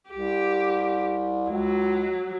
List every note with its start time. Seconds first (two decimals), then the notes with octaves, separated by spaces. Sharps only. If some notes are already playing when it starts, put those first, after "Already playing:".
0.10 C2 G4
1.50 C#2 F#3